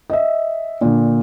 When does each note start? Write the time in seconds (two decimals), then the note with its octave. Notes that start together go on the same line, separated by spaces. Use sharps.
0.10 D#5 E5
0.81 A#2 D3